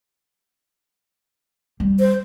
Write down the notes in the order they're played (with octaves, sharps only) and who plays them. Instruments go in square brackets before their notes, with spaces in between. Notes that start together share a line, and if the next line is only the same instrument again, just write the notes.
[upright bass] G3
[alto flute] C5